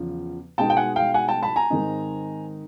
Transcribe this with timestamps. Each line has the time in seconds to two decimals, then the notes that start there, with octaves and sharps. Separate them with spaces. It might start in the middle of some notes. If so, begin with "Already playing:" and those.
Already playing: E2 C#3 F3
0.58 B2 G#3 B3 D#4 G5 A5
0.70 G5
0.77 F#5 G#5
0.96 F5 G5
1.14 F#5 G#5
1.28 G5 A5
1.43 A5 B5
1.56 G#5 A#5
1.70 G#2 D#3 G#3 C4 D#4